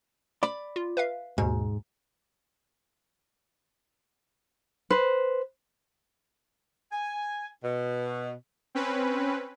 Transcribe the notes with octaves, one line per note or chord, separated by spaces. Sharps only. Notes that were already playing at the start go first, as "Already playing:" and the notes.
D5 B5
F4
B4 E5 F5
D#2 G#2 B2
B4 C5
G#5
B2
C4 C#4 B4